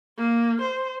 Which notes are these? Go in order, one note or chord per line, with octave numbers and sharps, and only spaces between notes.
A#3
C5